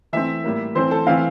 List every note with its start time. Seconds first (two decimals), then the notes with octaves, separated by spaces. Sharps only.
0.13 E3 A3 C4 E5
0.44 A2 G3 A#3
0.75 E3 A3 C4 C5
0.91 A4
1.07 E3 A3 C4 F5